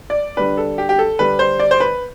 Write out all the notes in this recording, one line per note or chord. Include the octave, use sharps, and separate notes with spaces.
D5
D3 G3 D4 B4
A4
G4
G4
A4
D3 G3 D4 B4
C5
D5
C5
B4